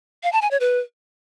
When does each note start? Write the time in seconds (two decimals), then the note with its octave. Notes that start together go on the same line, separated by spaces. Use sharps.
0.23 F5
0.33 A5
0.42 G#5
0.51 C#5
0.60 B4